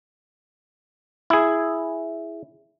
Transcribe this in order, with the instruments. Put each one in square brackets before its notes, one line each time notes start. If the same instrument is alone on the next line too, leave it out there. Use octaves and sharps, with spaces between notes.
[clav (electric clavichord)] E4 G#4